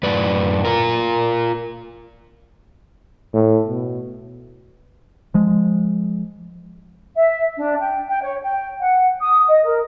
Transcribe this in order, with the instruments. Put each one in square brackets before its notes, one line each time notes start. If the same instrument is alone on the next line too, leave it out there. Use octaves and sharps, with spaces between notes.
[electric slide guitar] F#2 A2 B4 D5
F4 A#4
[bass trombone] A2
B2
[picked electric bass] F3 G#3
[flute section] E5
D4
G5
G5
C#5
G5
F#5
D#6
D#5
A#4